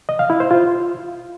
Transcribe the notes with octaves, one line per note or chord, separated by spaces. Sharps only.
D#5
F5
E4
C5
F4